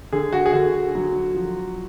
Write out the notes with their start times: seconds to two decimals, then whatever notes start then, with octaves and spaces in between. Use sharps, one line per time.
0.12 D3 G#4
0.33 F#4
0.46 G#4
0.53 D3 F#4
0.95 F#3
1.34 F3